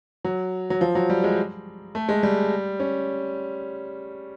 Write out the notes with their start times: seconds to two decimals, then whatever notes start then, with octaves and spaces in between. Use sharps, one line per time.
0.25 F#3
0.70 F#3
0.81 F3
0.95 F#3
1.10 G3
1.24 G#3
1.95 A3
2.09 G#3
2.23 G3
2.80 C#4